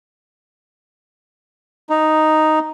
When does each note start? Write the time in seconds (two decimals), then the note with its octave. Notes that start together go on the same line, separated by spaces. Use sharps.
1.90 D#4